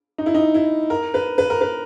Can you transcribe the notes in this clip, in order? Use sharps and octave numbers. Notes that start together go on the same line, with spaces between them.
D#4
E4
D#4
E4
A#4
B4
B4
A#4
B4